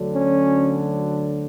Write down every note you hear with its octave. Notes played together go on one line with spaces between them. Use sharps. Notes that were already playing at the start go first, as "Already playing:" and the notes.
Already playing: D2 D3 F#3
C#4